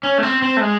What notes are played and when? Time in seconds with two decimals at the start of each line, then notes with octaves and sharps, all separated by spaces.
0.03 C#4
0.18 A3
0.23 C4
0.42 C4
0.57 A3
0.61 G#3